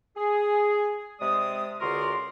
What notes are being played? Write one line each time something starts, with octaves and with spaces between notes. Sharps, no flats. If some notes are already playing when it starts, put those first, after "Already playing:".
G#4
C3 G#3 D5 D#6
C#2 D3 F#4 A#4 D5 C6